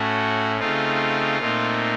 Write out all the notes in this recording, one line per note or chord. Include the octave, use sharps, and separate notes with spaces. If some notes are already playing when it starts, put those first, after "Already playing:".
Already playing: A2 A3 C#4 F#4
C#3 A3 C4 D#4 F4
A#2 A3 C4 D#4